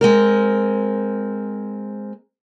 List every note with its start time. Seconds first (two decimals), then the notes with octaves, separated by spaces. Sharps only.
0.01 G#3 C4 A#4